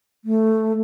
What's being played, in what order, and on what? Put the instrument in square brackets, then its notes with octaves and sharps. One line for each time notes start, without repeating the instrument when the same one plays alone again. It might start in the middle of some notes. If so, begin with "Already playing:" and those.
[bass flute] A3